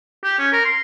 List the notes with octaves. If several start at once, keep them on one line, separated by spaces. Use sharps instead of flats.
G4
C#4
A#4
C6